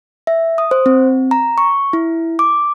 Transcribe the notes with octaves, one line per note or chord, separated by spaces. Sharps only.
E5
D#6
C5
C4
A#5
C#6
E4
D6